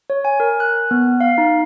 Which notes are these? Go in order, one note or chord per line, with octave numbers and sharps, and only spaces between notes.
C#5
G#5
A#4
F#6
B3
F5
D#4